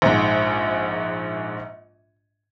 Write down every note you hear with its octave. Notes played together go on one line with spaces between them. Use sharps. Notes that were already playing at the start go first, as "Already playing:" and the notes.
A#1 G#2